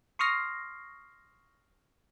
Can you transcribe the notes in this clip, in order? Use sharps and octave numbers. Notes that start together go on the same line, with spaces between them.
C6 C#6 D#6 F6 A#6 C7